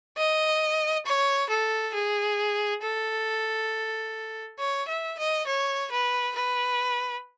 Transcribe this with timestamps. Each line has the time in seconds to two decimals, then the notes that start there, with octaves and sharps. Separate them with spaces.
0.17 D#5
1.06 C#5
1.49 A4
1.94 G#4
2.82 A4
4.59 C#5
4.88 E5
5.18 D#5
5.47 C#5
5.91 B4
6.35 B4